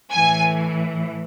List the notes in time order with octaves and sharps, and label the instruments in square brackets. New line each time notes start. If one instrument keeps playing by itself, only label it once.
[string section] A2 E3 G#5